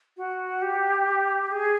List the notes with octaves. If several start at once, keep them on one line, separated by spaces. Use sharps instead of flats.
F#4
G4
G#4